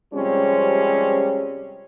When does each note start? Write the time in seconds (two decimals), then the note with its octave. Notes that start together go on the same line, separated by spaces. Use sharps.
0.13 C3 F3 G3 G#3 C4 C#4